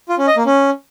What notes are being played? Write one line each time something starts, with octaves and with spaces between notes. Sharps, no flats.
F4
C#4
D#5
A#3
C#4